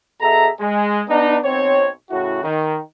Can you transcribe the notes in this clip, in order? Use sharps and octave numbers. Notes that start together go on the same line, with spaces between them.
B2 G#4 A4 E5 A#5
G#3
B3 D4 D#4
B1 C4 C#5
A2 C#3 E4 F#4
D#3